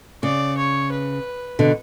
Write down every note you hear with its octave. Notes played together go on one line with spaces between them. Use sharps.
C#3 D5
C#5
B4
B2 D3